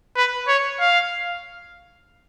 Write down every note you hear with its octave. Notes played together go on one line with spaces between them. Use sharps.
B4
C#5
F5